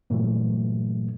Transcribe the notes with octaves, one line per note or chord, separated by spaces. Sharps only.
G2 A#2 E3 F#3 A3